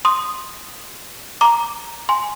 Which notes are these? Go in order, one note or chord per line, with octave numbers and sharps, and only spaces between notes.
C6 D#6
A#5 D6
G#5 C6